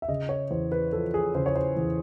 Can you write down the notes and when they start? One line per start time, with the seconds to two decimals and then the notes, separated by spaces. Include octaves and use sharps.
0.02 E5
0.08 C#3 D#5
0.29 C#5
0.51 E2 C5
0.72 B4
0.92 F3 A4
1.14 G#4
1.35 C#3 C5
1.46 C#5
1.56 C5
1.77 E2